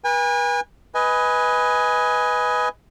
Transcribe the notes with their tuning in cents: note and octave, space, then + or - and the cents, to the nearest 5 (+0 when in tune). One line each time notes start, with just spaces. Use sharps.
B4 -35 G#5 -35
B4 +0 D#5 +20 G#5 +0